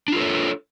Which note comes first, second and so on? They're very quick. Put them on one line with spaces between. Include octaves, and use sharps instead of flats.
D4 F4 A4 C#5